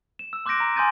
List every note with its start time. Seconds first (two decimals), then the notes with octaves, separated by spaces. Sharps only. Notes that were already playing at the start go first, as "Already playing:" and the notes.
0.19 E7
0.33 E6
0.46 C6 D6 F#6 G6 A#6 D7
0.60 A#5
0.76 G#5 C6 D#6 G6 A6 D#7